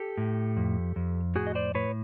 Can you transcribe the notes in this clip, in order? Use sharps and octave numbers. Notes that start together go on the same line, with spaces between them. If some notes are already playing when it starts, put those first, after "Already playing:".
Already playing: G4 A4
A2
F2
F2
A2 F#4 G#4
D#5
C5 D5
A2 B4 C#5